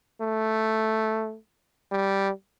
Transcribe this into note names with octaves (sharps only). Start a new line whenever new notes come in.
A3
G3